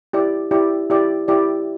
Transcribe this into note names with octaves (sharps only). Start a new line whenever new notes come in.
E4 G4 D5
E4 G4 D5
E4 G4 D5
E4 G4 D5